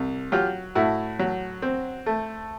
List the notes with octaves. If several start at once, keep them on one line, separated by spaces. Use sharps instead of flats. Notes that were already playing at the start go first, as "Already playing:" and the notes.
Already playing: C2
F#3 F4 G4
A2 E4 F#4
F#3
C4
A3